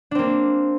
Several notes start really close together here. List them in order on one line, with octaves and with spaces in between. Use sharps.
D4 C4 A#3